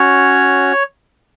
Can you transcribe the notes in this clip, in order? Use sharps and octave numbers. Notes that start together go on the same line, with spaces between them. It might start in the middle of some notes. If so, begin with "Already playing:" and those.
Already playing: C#4 F#4 C#5